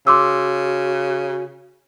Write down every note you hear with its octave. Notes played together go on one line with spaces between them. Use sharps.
C#3 F#4 C6 D6 E6